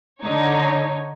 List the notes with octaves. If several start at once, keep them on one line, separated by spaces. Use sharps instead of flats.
D3 D#4 C#5